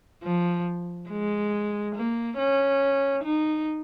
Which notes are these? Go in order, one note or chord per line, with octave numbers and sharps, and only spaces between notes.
F3
G#3
A#3
C#4
D#4